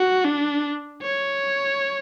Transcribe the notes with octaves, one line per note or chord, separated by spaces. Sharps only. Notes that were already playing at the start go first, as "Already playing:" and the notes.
Already playing: F#4
D4
C#5